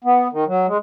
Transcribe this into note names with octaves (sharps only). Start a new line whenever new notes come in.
B3
D#3
F#3
G#3